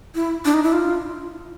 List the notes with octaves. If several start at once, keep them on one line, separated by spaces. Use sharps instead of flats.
E4
D4
D#4
E4
F4